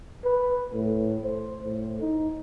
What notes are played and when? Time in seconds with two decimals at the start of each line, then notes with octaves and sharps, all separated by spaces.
0.24 B4
0.73 A2
1.24 C5
1.63 A2
2.01 D#4